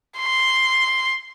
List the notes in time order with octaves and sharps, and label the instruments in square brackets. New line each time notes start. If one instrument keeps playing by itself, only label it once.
[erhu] C6